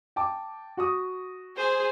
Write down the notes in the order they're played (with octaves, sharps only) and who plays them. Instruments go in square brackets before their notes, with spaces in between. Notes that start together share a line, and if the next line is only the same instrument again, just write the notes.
[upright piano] G5 A5 D6
F#4 C#6 D#6
[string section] G#4 [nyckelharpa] C5